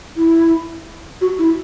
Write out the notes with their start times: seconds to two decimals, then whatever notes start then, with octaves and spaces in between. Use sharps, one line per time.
0.17 E4
1.21 F#4
1.39 E4